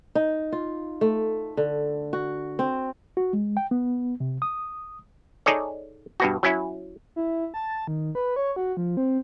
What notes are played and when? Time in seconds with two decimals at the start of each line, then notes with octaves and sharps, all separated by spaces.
0.15 D#4
0.52 F4
1.01 A3
1.57 D3
2.13 F#4
2.59 C4
3.17 F#4
3.33 G#3
3.57 G5
3.71 B3
4.20 C3
4.42 D#6
5.46 D#4 G#4 A4 C#5 D5
6.20 G2 B2 F#4
6.43 F#3 C#4 E4
7.16 E4
7.54 A5
7.87 D#3
8.15 B4
8.36 C#5
8.56 F#4
8.77 F3
8.97 C4